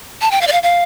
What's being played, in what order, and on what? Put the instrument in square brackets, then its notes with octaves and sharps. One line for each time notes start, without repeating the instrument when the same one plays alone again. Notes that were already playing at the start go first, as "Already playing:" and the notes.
[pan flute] A5
G5
F5
D5
F5
F5